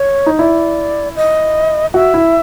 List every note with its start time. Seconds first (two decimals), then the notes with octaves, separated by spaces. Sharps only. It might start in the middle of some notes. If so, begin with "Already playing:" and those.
Already playing: C#5
0.26 D#4
0.38 E4 D5
1.16 D#5
1.94 F#4 E5
2.14 E4